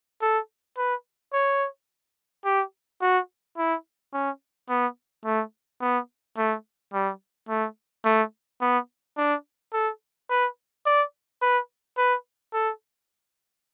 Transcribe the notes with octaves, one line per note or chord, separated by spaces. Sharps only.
A4
B4
C#5
G4
F#4
E4
C#4
B3
A3
B3
A3
G3
A3
A3
B3
D4
A4
B4
D5
B4
B4
A4